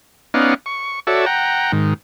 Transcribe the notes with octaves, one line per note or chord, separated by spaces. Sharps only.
B3 C#4 D#4 D5 F5 F#5
C#6
F#4 A4 C#5 D5 E5
F#5 G5 A#5
G#2 D#3